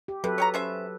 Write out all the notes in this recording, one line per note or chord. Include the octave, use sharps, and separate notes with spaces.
G4
C3 F#3 A4 B4
C#5 G5 A#5
C#4 C5 E5